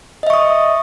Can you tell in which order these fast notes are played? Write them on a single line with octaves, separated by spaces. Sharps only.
D#5 E5 C#6 D#6